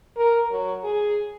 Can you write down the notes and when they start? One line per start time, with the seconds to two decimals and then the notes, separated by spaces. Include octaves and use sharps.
0.16 A#4
0.51 F#3
0.84 G#4